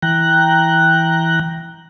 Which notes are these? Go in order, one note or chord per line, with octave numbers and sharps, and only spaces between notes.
E3 G5 A#5 F#6